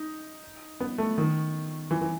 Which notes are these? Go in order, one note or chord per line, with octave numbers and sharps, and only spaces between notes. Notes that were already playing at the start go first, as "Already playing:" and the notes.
Already playing: D#4
B3
A3
D#3
E3
E3